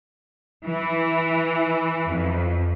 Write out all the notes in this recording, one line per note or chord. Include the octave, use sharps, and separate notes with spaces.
E3
F2